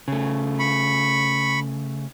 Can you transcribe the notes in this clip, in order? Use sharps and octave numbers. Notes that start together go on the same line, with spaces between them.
C#3 A3
B5 C#6